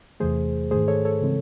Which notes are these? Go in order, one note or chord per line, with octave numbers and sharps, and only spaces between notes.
E2 C3 E3 A3 G#4 C5
G#2 D#3 A3 G#4 C5
A4 C#5
A4 C#5
C#3 E3 G#3 C4